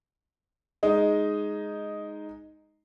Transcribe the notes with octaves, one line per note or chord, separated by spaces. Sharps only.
G#3 D#4